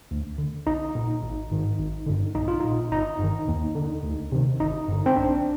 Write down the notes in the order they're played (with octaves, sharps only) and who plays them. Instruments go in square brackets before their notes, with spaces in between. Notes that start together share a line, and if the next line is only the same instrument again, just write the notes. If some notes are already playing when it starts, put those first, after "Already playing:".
[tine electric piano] D2
D3
A#1 D#4
A#2
G#1
G#2 D#3
G#1
G2 D3
A#1 D#4
F4
A#2 D#4
G1 D#4
G2 D#3
D#2
D3
D2
C3 D#3
G1 D#4
G2 D3
C4
A#1 D4